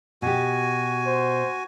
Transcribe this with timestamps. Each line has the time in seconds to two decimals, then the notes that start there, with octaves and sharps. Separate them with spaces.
0.22 B2 F#4 G4 G#5
1.06 C5